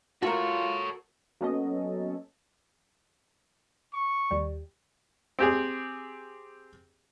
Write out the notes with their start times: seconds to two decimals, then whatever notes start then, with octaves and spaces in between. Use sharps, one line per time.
0.23 F4 F#4 A4 A#4 C#5
1.41 F#3 A#3 B3 C#4 A4 D#5
3.93 C#6
4.31 D#2 G3
5.39 C4 G4 G#4